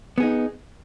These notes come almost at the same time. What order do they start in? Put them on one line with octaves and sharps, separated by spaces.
B3 G#4 D#4